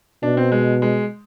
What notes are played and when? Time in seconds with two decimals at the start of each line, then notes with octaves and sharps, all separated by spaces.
0.23 B2 D4
0.37 C4
0.52 G#3
0.82 G#3